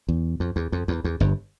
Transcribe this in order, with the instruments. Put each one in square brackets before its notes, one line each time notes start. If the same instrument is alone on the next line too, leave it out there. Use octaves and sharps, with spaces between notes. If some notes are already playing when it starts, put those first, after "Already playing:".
[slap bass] E2
F2
E2
F2
E2
E2
G1 G2